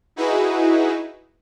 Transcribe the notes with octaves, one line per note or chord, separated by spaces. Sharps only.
D#4 E4 F#4 G#4 B4